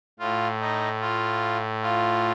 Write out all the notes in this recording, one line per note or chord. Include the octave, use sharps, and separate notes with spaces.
A2 F4
D#4
F4
F4